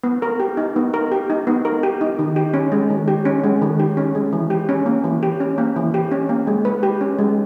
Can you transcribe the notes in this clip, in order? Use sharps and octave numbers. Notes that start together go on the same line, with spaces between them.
B3
A#4
G4
D#4
B3
A#4
G4
D#4
B3
A#4
G4
D#4
D#3
G4
C#4
G#3
D#3
G4
C#4
G#3
D#3
G4
C#4
G#3
E3
G4
C#4
A#3
E3
G4
C#4
A#3
E3
G4
C#4
A#3
G#3
B4
G4
C#4
G#3